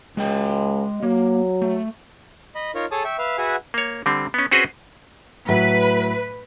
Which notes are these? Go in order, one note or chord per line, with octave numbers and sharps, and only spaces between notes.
C#2 G#3 D#5 G5
F#3 A#3
A3
D#5 B5
D#4 F4 A#4 C#5
G#4 A4 C#5 A5 D#6
E5 G5 C#6
B4 E5 F5 F6
F#4 G#4 B4 E5 F#5 G#5
A#3 C#5
D3 G3 C4
B3 C#4
C4 C#4 F#4 G#4 B4 C5
A2 F#3 B4